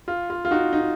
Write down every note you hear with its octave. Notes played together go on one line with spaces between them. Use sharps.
F4
F4
F4
D#4 F#4
D#4